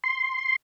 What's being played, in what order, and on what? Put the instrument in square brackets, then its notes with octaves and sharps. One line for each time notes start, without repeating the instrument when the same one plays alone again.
[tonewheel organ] C6